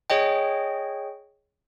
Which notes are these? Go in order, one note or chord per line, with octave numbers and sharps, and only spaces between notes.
G#4 C#5 D#5 G5